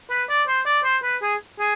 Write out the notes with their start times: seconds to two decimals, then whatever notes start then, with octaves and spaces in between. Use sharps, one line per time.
0.10 B4
0.29 D5
0.48 C5
0.66 D5
0.84 C5
1.03 B4
1.22 G#4
1.59 G#4